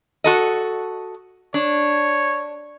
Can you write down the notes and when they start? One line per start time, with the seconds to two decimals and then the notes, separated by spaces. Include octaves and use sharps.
0.24 F#4 A4 D#5
1.54 D4 C#5